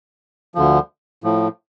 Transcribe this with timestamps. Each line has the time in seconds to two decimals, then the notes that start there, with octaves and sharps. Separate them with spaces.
0.55 D2 D3 F3
1.24 A2 F3